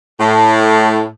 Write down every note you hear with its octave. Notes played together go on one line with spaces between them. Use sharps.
A2